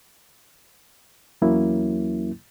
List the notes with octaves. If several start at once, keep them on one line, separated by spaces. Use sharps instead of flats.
E2 F#3 A#3 C#4 E4